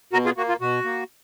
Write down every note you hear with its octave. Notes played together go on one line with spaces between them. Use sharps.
B2 F#4 A#4
F4 G#4
A#3 F#4
F4
B2 F#4
A#3